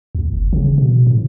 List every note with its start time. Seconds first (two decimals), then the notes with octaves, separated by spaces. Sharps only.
0.15 D2
0.34 F#1
0.53 C#3
0.78 B2
1.07 A2